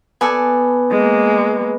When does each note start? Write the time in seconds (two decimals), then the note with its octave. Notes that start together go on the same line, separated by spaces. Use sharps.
0.21 B3 A4 D5 G#5
0.91 G#3 A#3